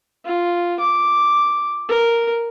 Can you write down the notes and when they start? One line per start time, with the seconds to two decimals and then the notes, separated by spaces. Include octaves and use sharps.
0.25 F4
0.79 D6
1.88 A#4